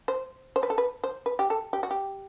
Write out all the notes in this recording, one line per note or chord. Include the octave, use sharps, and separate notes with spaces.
C5
C5
B4
A4
B4
C5
B4
G4
A4
G4
F#4
G4